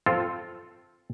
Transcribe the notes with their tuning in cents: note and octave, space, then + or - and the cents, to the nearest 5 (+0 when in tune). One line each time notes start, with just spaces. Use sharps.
C4 +0 F4 +0 A4 +0